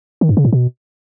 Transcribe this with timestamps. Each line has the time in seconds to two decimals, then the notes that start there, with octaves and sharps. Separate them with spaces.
0.21 D#3
0.29 G2
0.37 C#3
0.45 A2
0.53 B2